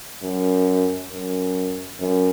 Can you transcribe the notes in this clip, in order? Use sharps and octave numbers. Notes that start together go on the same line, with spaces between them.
F#2
F#2
F#2